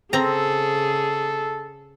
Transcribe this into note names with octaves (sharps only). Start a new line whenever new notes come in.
C#3 C4 G#4 A4 A#5